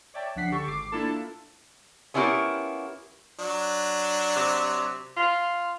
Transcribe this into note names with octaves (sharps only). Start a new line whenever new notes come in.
C#5 D5 E5 G5 A5
C#2 F3 D4 F#5 B6 C7
D3 G4 A4 C#6
G#1 D6 C7
A#3 D4 E4 F4 A4 A5
B3 C#4 E4 F4 G4 A#4
F#3 D4
C3
F4